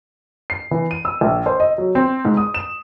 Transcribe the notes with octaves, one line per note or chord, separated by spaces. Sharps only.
C7
E3
D#7
E6
A#1
C5
D#5
F#3
C4
G#2
D#6
E7